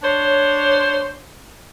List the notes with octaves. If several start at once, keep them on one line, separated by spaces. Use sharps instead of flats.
D4 C5 C#5